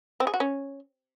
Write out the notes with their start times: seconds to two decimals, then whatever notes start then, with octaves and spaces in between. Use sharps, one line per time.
0.20 C4
0.27 G#4
0.34 F#4
0.40 C#4